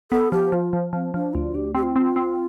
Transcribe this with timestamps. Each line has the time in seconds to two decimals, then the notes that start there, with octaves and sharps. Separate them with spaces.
0.11 B3 A4
0.32 F3 G4
0.52 F3 F4
0.73 F3
0.93 F3 C4
1.14 F3 D4
1.34 D2 F4
1.54 D2 G4
1.75 C4 G4
1.83 F4
1.92 E4
1.96 C4 F4
2.16 C4